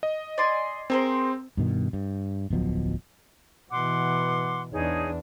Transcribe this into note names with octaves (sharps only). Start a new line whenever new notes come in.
D#5
D5 G#5 C6
C4 G#4 A#4 C5
G2 B2 D#3
G2
D1 B1 B2 F3
B2 E3 F#5 C6 D6
E2 D4 D#4 G#4 C#5